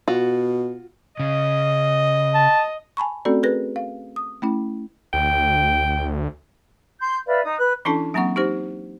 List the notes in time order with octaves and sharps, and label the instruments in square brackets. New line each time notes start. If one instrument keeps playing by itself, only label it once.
[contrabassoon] B2 [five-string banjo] F4 F#4
[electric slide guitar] C#3 [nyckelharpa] D#5
[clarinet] A5
[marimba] G#5 A5 B5 C#6
A3 C4 C#4 F#4 A4 D5
G#4 A#4 B4 A#6
F5
D#6
A3 C#4 E4
[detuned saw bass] D2 [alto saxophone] G5
[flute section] C6 G6
B4 D5 E5 F5
D#4 D#6
B4 F#6
[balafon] E3 C#4 D4 E4 A4 A5
F#3 A#3 C4 F#5 C#6
D#4 G4 C5